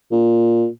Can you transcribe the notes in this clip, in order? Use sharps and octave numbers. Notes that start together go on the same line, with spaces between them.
A#2